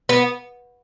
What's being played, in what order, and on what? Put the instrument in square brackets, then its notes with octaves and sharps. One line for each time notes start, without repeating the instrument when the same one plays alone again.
[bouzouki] B3